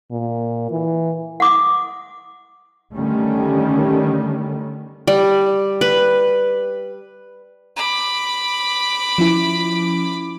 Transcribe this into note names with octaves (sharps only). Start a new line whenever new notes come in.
A#2
E3
F#5 D6 D#6
D3 D#3 G3 A3 C#4
G3
B4
B5 D6
F3 C#4 E4